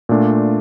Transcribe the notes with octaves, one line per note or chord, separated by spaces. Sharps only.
A#2 A3 D4 F4